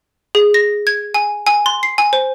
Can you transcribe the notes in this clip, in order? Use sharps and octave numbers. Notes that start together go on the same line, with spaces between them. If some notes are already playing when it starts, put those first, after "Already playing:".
G#4
A#6
G#6
G#5
G#5
C6
C7
G#5
C5